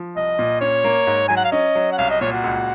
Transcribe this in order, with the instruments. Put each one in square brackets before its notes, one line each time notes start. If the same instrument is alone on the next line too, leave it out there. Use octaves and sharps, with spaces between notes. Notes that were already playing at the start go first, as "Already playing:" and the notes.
Already playing: [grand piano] F3
[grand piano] C2 [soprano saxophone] D#5
[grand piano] A#2
[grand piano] C#4 [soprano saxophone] C#5
[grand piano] A#3
G#2
[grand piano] F#3 [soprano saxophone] G#5
[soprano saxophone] F#5
F5
[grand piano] C#4 [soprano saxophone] D#5
[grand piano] F#3
[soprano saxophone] F#5
[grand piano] C2 [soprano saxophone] F5
[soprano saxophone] D#5
[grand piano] A#2 [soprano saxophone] C#5
[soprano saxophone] F#4
[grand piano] C#2